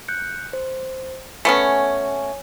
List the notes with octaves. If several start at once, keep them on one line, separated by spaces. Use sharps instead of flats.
F#6 G6 C#7
C5
A3 B3 C#4 C#5 G#5